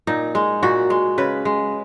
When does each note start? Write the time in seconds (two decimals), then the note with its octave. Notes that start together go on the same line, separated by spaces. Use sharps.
0.07 A#2 D#4
0.35 G#3
0.63 A#2 F#4
0.90 G#3
1.18 C#3 B4
1.45 G#3